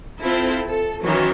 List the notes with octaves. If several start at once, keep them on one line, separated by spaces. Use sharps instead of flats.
C4 E4 F4 A4
A4
D#3 E3 F#3 C#4